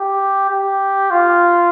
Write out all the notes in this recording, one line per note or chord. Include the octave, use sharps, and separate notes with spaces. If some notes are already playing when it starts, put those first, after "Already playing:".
Already playing: G4
G4
F4